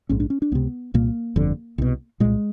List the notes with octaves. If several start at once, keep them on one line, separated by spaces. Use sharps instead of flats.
A#1 G#2 C#4
D4
C#4
D4
C#2 C3 B3
C2 A#2 A#3
G1 F2 D3
C2 B2
C2 A#2 G#3